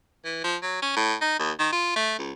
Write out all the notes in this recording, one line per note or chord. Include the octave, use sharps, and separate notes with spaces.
E3
F3
F#3
C#4
A2
D#4
D#2
D#3
F4
A3
C#2